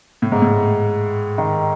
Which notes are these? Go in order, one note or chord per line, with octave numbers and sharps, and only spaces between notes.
A2
G#2
A2
D#3